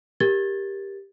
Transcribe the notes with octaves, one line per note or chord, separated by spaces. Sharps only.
G4 A#4 G#6 A6 G7